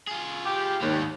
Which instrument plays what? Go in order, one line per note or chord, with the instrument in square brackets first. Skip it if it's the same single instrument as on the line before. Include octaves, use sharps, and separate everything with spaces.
[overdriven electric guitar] F4 G#4
[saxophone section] G4
[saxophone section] D#2 [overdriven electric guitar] G#2 G3